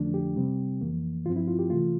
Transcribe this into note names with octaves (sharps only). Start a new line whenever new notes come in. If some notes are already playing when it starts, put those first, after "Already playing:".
Already playing: F2 D3 F3 A3 D4
G4
C3 G3 C4
F2 E3 A#3
G2 F3 C4 F4
E4
F4
G4
C3 E3 A3 F4